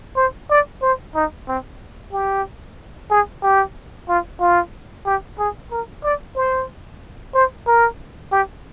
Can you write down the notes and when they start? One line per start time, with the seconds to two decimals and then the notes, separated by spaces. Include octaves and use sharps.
0.17 C5
0.50 D5
0.82 C5
1.15 D#4
1.48 C4
2.13 G4
3.11 G#4
3.43 G4
4.09 F4
4.41 F4
5.06 G4
5.39 G#4
5.71 A#4
6.04 D5
6.36 C5
7.34 C5
7.67 A#4
8.32 G4